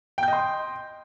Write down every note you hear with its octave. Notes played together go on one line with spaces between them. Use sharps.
D#5 G5 C6 G6